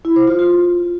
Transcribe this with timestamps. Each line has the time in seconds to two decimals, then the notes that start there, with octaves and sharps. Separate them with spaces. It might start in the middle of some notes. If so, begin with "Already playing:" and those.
0.05 E4
0.16 C5
0.27 F4
0.39 F4